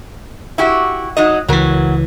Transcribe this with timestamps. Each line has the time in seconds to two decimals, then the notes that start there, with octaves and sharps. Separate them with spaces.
0.58 E4 F#4 G4
1.17 F#3 D#4 D#5
1.48 C#2 E3 F#3 A#4